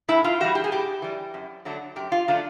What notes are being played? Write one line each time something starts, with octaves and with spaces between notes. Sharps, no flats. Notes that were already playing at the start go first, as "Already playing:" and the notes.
A2 E4
F4
E3 G3 F#4
G4
G#4
A2 G4
E3 G3
F#2
D3 F#3 A3 D4
F#2 G4
F4
D3 F#3 A3 D4 F4